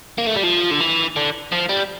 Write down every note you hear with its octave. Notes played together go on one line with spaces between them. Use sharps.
A#3
A3
G3
F3
D3
E3
D3
F3
G3